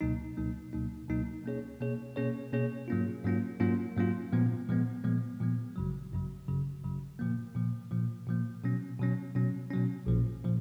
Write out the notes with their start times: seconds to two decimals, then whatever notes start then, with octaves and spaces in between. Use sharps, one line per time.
0.01 C#2 B2 F#3 A#3 D#4
0.37 C#2 B2 F#3 A#3 D#4
0.73 C#2 B2 F#3 A#3 D#4
1.08 C#2 B2 F#3 A#3 D#4
1.44 B2 A#3 C#4 G#4 C#5
1.81 B2 A#3 C#4 G#4 C#5
2.16 B2 A#3 C#4 G#4 C#5
2.52 B2 A#3 C#4 G#4 C#5
2.88 G#2 F#3 A#3 C#4 F4
3.24 G#2 F#3 A#3 C#4 F4
3.60 G#2 F#3 A#3 C#4 F4
3.96 G#2 F#3 A#3 C#4 F4
4.32 A#2 F3 G#3 B3
4.69 A#2 F3 G#3 B3
5.04 A#2 F3 G#3 B3
5.41 A#2 F3 G#3 B3
5.76 G#1 F#2 C#3 F#3
6.11 G#1 F#2 C#3 F#3
6.48 G#1 F#2 C#3 F#3
6.84 G#1 F#2 C#3 F#3
7.19 A#2 F3 A#3
7.55 A#2 F3 A#3
7.91 A#2 F3 A#3
8.27 A#2 F3 A#3
8.64 B2 F#3 C#4
9.00 B2 F#3 C#4
9.35 B2 F#3 C#4
9.71 B2 F#3 C#4
10.06 A#1 A#2 F3
10.45 A#2 F3